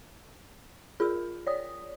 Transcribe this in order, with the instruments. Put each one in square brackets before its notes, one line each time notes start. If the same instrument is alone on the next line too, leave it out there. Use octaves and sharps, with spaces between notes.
[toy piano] F4 E6 [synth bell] G#4 A#4
[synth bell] C#5 D5 D#6